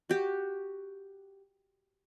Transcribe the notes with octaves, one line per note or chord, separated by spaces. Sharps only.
F#4 G4